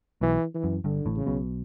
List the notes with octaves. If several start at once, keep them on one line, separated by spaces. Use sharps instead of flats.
B1 B2 E3
E3
F#2
G1 G2 D3
A1 A2
C#3
B1 B2